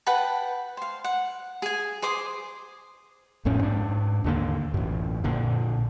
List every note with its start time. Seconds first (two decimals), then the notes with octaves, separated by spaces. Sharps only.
0.07 B4 F#5 G5 A5
0.77 C5 F5
1.04 F#5
1.62 G#4 G#5
2.02 G#4 C5 D6 D#6
3.45 A1 F2 A2 C#4
3.63 G#2 D4
4.24 D#2 D3 A#3
4.74 A1 F#2
5.24 A#1 A#2 D3